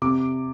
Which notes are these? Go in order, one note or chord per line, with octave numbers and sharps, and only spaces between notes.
C3 D6